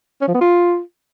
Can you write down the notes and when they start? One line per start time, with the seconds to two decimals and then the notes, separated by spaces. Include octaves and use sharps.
0.21 C#4
0.28 F3
0.35 B3
0.41 F4